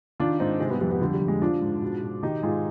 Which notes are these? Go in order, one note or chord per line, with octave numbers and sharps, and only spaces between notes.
D#3 D4 F4
G#2 C4 D#4
C3 G#3 C4
G3 B3
F2 G3 B3
G3 B3
D3 G3
G3
F2
G#3
F3 D4 F4
G#2
B2
B2
D#3 D#4 G4
G#2 F4 G#4